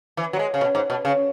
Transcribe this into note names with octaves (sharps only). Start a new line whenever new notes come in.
E3
F#3
G#3
C#3
B2
G#2
B2
C#3